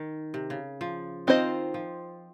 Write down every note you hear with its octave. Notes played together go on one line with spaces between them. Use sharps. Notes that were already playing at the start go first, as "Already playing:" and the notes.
Already playing: D#3
C3
C#3
F3
D#3 C4 F4 C5 D#5
F3